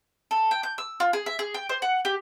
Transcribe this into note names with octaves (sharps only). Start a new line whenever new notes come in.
A4
G5
G6
E6
F4
G#4
E5
G#4
G5
C5
F#5
G4